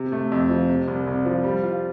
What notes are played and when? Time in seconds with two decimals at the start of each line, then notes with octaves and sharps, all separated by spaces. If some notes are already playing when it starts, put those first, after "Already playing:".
Already playing: C3
0.12 A3
0.32 F2
0.50 F3
0.69 C3
0.88 C2
1.07 C2
1.25 F3
1.44 G3
1.64 F4